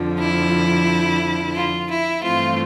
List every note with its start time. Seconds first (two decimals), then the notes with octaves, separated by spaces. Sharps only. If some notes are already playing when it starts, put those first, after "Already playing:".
Already playing: F2 D3 F3
0.20 E4
1.55 F4
1.89 E4
2.23 G2 E3 A3 C4 F4